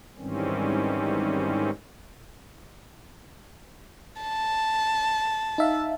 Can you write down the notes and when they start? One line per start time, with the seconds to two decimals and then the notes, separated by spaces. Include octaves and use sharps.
0.18 G#2 D#3 E3 G3 C4 C#4
4.22 A5
5.58 D#4 E5 F5